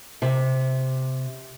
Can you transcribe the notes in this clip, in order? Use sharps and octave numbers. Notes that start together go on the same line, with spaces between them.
C3